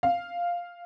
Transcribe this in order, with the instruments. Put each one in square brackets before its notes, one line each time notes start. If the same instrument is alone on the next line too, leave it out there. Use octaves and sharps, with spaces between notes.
[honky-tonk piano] F5